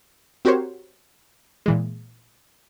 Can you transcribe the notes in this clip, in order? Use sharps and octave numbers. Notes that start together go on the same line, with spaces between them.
C4 F#4 G4 A#4 C5 C#5
A#2 E3 G#3